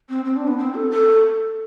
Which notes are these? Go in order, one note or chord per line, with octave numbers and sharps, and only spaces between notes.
C4
C4
D4
B3
C4
A4
A4